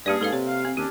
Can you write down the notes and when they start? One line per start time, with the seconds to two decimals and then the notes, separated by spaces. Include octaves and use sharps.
0.06 G2 A#3 C#4 D4 G4 G#4 D5
0.21 G#2 A4 B4 F5
0.33 C3 C#5
0.47 F5
0.65 C4
0.77 D#2 C#4 D4 G4